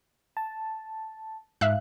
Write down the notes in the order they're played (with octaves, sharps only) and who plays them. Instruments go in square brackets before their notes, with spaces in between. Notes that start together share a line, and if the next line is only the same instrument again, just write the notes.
[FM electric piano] A5
[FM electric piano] G#2 [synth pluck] E5 F5 F#6